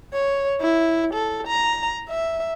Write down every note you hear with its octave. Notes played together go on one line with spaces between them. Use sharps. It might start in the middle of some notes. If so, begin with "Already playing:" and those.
C#5
E4
A4
A#5
E5